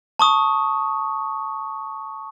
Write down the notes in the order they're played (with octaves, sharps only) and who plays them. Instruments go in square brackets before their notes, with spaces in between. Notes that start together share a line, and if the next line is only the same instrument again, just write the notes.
[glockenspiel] A5 C#6 D#6